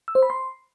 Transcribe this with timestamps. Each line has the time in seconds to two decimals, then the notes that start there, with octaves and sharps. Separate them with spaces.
0.08 E6
0.15 C5
0.23 B5
0.30 C6